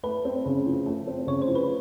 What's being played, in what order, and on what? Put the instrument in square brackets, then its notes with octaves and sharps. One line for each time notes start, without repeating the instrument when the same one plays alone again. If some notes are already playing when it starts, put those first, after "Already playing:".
[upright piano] A3 [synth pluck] B4
[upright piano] C4
C#3
F3
A3
C4
[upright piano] C#3 [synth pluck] C#5
[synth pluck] C5
[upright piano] F3
[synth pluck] B4